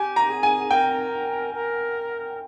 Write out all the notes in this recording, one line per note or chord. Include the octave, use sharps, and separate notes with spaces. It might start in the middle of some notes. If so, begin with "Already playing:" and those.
Already playing: G4 G#5
A#5
G#4
G#5
A#4 G5
A#4